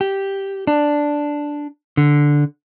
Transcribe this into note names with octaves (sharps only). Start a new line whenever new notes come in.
G4
D4
D3